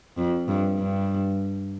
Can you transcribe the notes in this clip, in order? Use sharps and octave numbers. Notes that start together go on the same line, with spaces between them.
F2
G2
G2